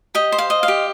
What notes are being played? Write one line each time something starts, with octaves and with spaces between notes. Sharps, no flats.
G4 D#5
C5
F5
D#5
F5
G4